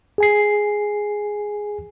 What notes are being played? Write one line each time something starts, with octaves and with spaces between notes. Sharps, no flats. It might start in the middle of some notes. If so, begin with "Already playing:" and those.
G#4 G#5 C7